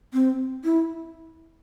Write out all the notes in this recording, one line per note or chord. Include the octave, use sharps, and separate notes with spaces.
C4
E4